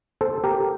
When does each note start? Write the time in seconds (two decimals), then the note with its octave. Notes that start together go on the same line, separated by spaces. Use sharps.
0.21 A4 C5
0.44 G4 A#4